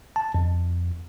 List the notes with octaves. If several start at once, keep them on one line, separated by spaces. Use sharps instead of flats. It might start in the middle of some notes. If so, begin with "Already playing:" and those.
A5
F2